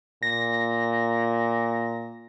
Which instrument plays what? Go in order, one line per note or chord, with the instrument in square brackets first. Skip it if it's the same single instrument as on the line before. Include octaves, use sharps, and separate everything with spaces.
[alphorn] A#2 [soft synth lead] A#6